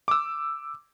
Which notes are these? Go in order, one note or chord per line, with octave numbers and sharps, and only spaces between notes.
D6 E6